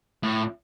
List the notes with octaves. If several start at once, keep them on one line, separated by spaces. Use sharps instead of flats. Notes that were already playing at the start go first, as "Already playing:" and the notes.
A2